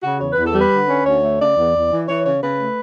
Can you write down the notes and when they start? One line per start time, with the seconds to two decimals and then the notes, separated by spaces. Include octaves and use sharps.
0.03 C#3 F#4
0.20 E2 C#5
0.33 E2 B4
0.46 A4
0.54 G3
0.59 B4
0.71 D3
0.88 C#4
1.05 D2 C#5
1.22 A3
1.40 C#3 D5
1.57 E2
1.74 E2
1.91 E3
2.08 E3 C#5
2.25 C#3 C#5
2.42 C#3 B4
2.60 A3